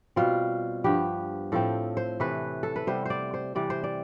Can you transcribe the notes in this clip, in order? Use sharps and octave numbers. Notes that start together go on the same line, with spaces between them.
B2 G3 C4 F4
G2 F3 B3 G4
A2 F3 C4 A4
C5
C3 E3 A3 B4
A4
B4
C3 G3 B3 C5
C5 D5
C5
C3 E3 G3 C4 D5
C5
D5